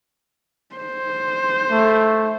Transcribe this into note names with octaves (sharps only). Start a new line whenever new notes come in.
C5
A3